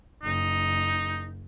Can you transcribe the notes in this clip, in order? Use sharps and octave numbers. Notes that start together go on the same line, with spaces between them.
F#1 D#4